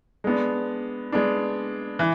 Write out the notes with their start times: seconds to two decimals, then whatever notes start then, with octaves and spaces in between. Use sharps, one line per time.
0.24 G#3 B3 D4
1.12 G#3 B3 D4
1.99 E3